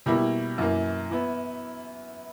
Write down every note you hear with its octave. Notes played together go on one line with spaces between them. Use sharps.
B2 G3 A#3 E4
F#2 E3 A#3
E3 B3 E4